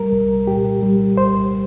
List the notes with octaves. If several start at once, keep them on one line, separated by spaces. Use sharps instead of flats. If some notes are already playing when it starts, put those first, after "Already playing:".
Already playing: G3 A#4
C2
A#2 G4
G3
C2 C5